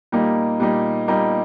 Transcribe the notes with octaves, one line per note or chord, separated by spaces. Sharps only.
A#2 G3 A#3 D#4
A#2 G3 A#3 D#4
A#2 G3 A#3 D#4